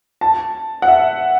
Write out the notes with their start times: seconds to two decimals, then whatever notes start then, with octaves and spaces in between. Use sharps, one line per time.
0.21 A5
0.82 F#5
0.88 E5